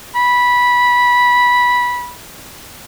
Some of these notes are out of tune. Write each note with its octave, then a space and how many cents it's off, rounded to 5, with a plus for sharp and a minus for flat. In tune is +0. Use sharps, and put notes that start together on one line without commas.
B5 -15